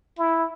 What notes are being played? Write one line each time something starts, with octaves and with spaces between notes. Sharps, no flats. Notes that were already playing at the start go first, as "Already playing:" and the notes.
E4